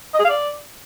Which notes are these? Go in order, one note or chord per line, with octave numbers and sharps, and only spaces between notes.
D#5
G#4
F5
D5